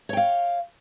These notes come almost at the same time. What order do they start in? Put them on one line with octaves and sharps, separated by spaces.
C#5 G5 F5